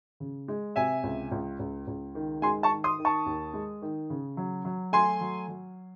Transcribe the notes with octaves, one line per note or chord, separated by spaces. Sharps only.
C#3
G#3
C3 E5 G#5
C#2
C#2
C#2
C#2
D#3
G#3 G#5 C6
A5 C#6
D#3
C6 D#6
D#3
A5 C#6
D#2
G#3
D#3
C#3
F#3
F#3
A3 G#5 C6
F#3
F#3